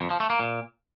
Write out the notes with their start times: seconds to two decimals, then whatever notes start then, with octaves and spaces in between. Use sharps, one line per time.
0.01 F2
0.10 F3
0.20 A3
0.30 A#3
0.39 A#2